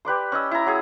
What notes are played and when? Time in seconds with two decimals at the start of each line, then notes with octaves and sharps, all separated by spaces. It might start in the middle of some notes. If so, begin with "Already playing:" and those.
0.05 G4 B4 D5 C6
0.32 C#4 D#5 E6
0.51 E4 A#5
0.66 F#3 G#4